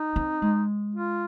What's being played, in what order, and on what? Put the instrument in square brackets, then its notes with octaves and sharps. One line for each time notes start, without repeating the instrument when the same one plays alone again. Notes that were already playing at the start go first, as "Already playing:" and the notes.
Already playing: [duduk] D#4
[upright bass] C4
G#3
[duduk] F4